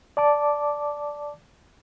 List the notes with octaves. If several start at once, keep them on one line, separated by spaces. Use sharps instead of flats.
D5 A5 D6